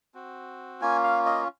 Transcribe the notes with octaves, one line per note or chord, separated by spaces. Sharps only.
C4 F#4
A#3 C#4 F4 G#5
F5
D#5